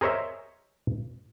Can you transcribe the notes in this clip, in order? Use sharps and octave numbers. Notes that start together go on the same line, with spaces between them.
G#4 A#4 C5 C#5 D#5 E5